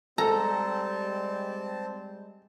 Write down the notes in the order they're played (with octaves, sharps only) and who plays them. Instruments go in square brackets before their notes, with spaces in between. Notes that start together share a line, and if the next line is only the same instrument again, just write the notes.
[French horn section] G3 G#3 [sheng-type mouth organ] C4 A5 [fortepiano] A4 [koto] A#5